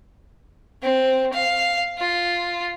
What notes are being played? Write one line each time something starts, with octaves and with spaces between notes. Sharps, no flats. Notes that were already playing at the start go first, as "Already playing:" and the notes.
C4
F5
F4